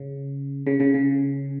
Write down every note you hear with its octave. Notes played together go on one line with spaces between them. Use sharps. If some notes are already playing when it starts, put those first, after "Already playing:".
Already playing: C#3
C#3
C#3
C#3